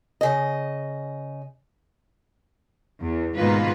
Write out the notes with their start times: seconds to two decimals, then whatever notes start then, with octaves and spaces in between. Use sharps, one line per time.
0.21 C#3 D#5
3.00 E2
3.37 G#2 B2 D#3 A#3 F4 B4